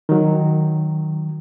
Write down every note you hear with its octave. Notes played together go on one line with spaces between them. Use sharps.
D#3 F#3